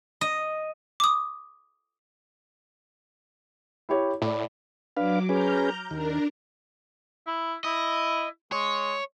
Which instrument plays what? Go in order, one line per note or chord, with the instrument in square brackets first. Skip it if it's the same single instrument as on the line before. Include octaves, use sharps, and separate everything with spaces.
[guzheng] D#5
[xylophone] D6 D#6
[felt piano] E4 G4 C#5
[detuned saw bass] A2 [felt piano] E4 D5
[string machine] F#3 D6 [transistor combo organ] D4 B4 F5
[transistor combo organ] C#4 G#4 B4 [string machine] A#5 F6 G6
[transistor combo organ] D#2 [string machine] D4 A#4
[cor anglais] E4
[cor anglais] E4 [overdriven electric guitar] D#5
[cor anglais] G#3 [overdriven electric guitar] C#5